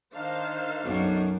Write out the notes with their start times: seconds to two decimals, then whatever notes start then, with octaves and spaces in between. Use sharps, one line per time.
0.15 D#3 D4 D#4 C5 F5 A5
0.84 B1 F#2